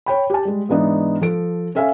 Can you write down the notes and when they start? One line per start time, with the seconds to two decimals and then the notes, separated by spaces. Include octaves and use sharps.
0.06 C#5 G5 B5
0.30 G4 A5
0.45 G3 G#3
0.69 G#2 E3 G#3 B3 D4 D#4
1.22 F3 A4 D7
1.75 C#4 A4 E5 F5 G#5